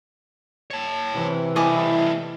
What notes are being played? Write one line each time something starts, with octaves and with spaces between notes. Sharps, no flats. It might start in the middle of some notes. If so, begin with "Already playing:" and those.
C#5 A5
C3 E3
G3 A3 E4 D#5 G#5 D6